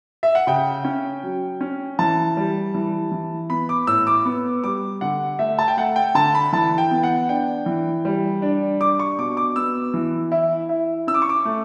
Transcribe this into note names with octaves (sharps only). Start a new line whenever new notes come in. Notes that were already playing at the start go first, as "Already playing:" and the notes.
E5
F#5
C#3 G5
C#4
F#3
C#4
E3 A5
G3
E3
E3
B3 B5
D6
A2 E6
D6
B3
G3 D6
D3 F#5
A3 E5
A5
G5
A3 F#5
G5
D3 A5
B5
E3 A5
G5
B3
G5
F#5
D4 G5
E3
G3
D4
D4 D6
C#6
B2 D6
D6
B3 E6
E3
E4
E4
C#4 E6
D6
C#6
D6
A3